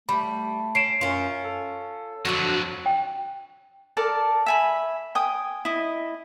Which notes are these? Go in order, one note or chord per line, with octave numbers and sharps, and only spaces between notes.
G3 A3 B5
C#4 C7 D7 E7
F#2 C#4 F4
A4
F2 D3 F#3 D4 F#4
G5
A4 A#4 D5 A5
E5 G#5 B5
G5 G#5 D#6
E4 D#5